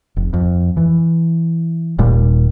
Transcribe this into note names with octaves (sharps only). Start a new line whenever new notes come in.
F1
F2
E3
D#1 A#2 G3